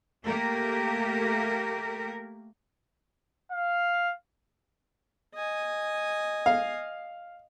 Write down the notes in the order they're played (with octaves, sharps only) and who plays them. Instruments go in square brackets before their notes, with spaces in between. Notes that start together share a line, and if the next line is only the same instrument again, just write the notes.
[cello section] A3 A#3 G4 A#4
[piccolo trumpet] F5
[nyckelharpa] D#5 G#5
[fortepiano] F5